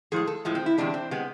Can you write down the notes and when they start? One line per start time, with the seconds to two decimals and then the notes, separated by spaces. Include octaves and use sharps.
0.12 A2 F3 G#3 G#4
0.27 A4
0.45 A2 F3 G#3
0.55 C4
0.66 E4
0.78 E2 C3 G#3 D4
0.94 C4
1.11 C3 G#3 B3